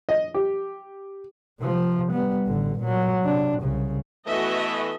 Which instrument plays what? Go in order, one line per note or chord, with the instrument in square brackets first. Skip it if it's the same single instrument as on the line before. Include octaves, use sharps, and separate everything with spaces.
[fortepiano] D#5
G4
[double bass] C3 F3
G3 B3
A1 D3
A#2 F#3
C3 D4
C2 C#3
[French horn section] E3 A3 B3 [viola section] F#4 D#5 [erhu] E5